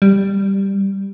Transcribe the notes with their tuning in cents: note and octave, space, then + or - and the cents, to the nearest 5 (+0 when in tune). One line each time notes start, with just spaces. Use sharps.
G3 +0